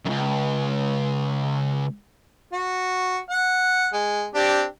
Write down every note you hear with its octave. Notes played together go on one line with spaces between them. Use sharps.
C#2 F#2
F#4
F#5
G#3
C4 D4 G4